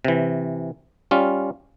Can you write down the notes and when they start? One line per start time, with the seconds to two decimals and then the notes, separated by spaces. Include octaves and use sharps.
0.05 C3 E3
1.11 G3 C#4 F4